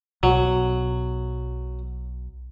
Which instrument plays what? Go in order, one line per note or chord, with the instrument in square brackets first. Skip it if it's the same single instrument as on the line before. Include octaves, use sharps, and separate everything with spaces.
[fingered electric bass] B1 B2 [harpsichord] F#3